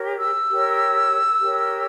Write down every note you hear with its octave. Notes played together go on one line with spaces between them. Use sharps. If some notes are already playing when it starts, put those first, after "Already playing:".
Already playing: G4 A#4 C#5
E6
G4 A#4 C#5
G4 A#4 C#5